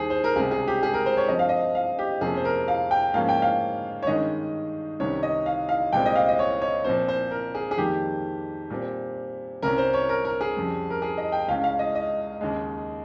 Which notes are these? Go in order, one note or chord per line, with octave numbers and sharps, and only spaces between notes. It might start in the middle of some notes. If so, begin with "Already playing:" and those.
Already playing: D#2 D#3 G3 G#4 C5
C5
A#4
C#2 C3 G3 G#4
G#4
G4
G#4
A#4
C5
C#5
G2 F3 C4 D#5
F5
D#5
F5
G4
F2 C3 F3 A#3 C#4 G#4
C5
A#4
F5
G5
G#2 F3 A#3 C#4 F5
G5
F5
C#5
G2 D#3 G#3 C#4 D#5
C2 C3 D#3 G3 C#4 C#5
D#5
F5
F5
C2 A#2 G#3 C4 G5
D#5
F5
D#5
C#5
C#5
A#2 F3 C4 C5
C5
A#4
G#4
G#4
F2 D#3 G3 A#3 G4
A#2 G3 C4
C2 C3 G3 C#4 A#4
C5
C#5
A#4
A#4
G#4
F2 C#3 G3
A#4
G#4
D#5
G5
C#2 C#3 G#3 C#4 F5
F5
D#5
D#5
D#2 C#3 G#3